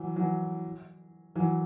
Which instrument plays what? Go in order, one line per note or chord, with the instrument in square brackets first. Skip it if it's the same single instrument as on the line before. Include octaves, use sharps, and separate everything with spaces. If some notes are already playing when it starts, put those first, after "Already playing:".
Already playing: [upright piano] E3 F#3
E3 F#3
E3 F#3